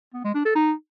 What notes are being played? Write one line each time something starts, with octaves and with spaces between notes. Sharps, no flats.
B3
G#3
D4
A4
D#4